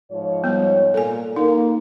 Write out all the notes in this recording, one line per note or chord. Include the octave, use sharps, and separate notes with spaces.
G#2 F3 C#5
G3 B3
A#2 A4 G#5
A#3 D#4